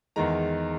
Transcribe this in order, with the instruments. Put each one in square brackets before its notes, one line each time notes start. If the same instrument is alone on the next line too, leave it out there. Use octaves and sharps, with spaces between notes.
[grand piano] E2 D#3 G#3 A#5